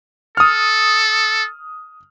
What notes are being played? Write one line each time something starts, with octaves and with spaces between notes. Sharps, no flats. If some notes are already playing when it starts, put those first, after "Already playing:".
A4 D#6 F6